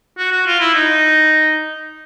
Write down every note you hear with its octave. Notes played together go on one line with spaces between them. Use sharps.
F#4
F#4
F4
E4
D#4